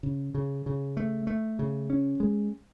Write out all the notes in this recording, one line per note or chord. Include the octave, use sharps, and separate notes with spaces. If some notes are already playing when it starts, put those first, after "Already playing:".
C#3
C#3
C#3
A3
A3
C#3
C#4
G#3